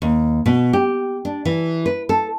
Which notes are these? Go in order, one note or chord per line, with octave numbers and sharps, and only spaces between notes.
D#2
B2
G4
D4
E3
B4
A4